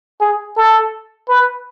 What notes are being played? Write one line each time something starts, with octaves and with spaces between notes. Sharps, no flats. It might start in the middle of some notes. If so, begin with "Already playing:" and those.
G#4
A4
B4